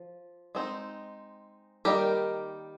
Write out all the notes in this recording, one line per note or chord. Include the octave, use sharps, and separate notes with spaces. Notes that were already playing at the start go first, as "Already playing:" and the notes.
Already playing: F3
G#3 C4 D#4
D#3 G3 A#3 D#4 G4 A#4